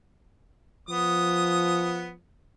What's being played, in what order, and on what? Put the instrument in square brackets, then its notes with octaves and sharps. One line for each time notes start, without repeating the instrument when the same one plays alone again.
[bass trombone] F3 [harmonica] B3 D#6